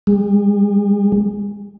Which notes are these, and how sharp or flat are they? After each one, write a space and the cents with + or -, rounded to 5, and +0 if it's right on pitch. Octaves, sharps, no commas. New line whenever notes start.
G#3 -40